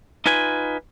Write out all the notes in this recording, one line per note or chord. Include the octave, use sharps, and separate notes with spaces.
D#4 F4 B4 G#5